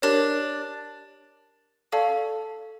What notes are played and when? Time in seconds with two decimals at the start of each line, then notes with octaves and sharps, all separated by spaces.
0.02 D4 G4 A#4 C#5
1.92 C#4 A4 D5 F5 A5